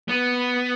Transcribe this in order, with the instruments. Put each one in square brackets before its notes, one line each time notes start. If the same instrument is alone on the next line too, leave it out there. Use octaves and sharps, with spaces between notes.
[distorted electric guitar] B3